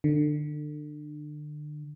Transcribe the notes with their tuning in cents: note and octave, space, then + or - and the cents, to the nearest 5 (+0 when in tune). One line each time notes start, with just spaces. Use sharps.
D3 +30